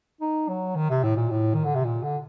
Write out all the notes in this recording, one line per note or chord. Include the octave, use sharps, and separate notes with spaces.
D#4
F#3
D#3
C3
A2
A#2
A2
D#3
D3
C3
A#2
D3